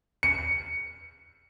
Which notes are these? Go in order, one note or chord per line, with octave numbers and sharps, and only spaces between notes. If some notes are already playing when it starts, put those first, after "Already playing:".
C#7